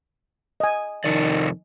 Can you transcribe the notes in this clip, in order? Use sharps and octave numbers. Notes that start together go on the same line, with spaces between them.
D#5 G#5
F2 C3 D#3 D5